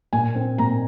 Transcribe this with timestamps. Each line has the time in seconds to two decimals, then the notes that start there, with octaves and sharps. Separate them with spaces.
0.13 A#2 G#5
0.35 C4
0.58 A#2 A#5